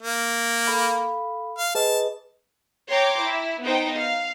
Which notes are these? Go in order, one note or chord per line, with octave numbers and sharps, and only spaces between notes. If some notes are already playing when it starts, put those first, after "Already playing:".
A#3
A4 F5 B5
F5
G#4 B4 D#5 A5
C#5 G5 A#5 C6 D6
E4
B3 D#4 C5 G5
F5